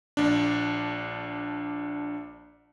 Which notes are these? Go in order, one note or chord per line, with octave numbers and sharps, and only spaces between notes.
A#1 D4